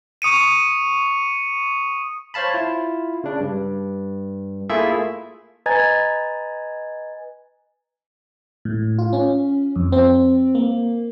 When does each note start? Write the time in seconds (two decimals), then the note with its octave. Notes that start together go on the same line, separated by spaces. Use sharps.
0.22 C#6 D#6 C#7 D#7
2.34 C5 C#5 F5 A5 B5
2.54 E4 F4
3.24 C#3 D4
3.40 G2
4.70 A3 A#3 E4 F4 G#4 E5
5.66 B4 D#5 G#5 A#5 G#6 A6
8.65 A2
8.99 F4
9.13 C#4
9.76 F2
9.92 C4
10.55 A#3